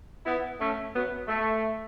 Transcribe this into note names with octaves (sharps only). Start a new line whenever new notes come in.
B3 E4
A3 C#4
F#3 B3
A3